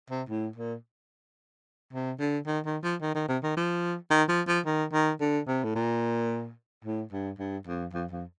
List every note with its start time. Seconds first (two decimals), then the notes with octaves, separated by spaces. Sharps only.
0.10 C3
0.29 A2
0.56 A#2
1.93 C3
2.19 D3
2.47 D#3
2.65 D#3
2.83 F3
3.01 D#3
3.15 D#3
3.28 C3
3.43 D#3
3.57 F3
4.10 D#3
4.28 F3
4.47 F3
4.65 D#3
4.93 D#3
5.20 D3
5.47 C3
5.64 A2
5.75 A#2
6.84 A2
7.12 G2
7.39 G2
7.67 F2
7.93 F2
8.11 F2